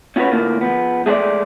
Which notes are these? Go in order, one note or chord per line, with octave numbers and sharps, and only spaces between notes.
C#4 F4 F#4 A4 B4 C#5
D2 A2 A#3 F4
F3 B3
G#3 A3 C#4 F#4 C5 D5